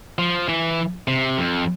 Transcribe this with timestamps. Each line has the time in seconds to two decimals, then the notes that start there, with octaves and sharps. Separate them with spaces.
0.18 F3
0.49 E3
1.08 C3
1.38 F2